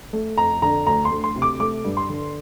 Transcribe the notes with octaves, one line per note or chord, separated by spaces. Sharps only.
A3
F2 A#5
D3 A#5
D2 A#5
C6
D2
C6
C3
D6
A3 D6
G2
C6
D3